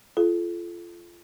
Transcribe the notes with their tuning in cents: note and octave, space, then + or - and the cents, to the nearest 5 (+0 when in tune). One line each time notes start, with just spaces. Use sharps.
F4 -25 A4 -30